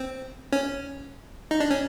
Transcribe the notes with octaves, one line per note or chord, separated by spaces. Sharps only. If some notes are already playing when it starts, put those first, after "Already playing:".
Already playing: C4
C#4
D#4
D4
C#4